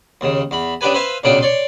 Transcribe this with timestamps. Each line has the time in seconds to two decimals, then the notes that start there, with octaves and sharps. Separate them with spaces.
0.21 D#2 C#3
0.51 E2 B5
0.81 C#3 D4 G4 B4 G#5
0.94 B4 C5 E5 F5 G#5
1.24 B1 A#2 C#3 C#4 D4 G5
1.41 C#5 D5 C6